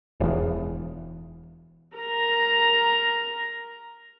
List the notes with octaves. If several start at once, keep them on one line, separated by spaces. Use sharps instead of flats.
E1 E2
A#4 A#5